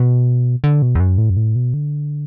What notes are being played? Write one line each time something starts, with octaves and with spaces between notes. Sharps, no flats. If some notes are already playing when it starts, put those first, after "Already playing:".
Already playing: B2
D3
B2
E2
F#2
A2
F#2
A2
B2
D3